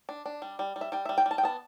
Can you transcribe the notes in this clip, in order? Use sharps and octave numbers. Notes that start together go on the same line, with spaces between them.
D4
D4
G3
G3
G3
E5
G3 G5
G3 E5
G5
G3
A5
G5
B3 A5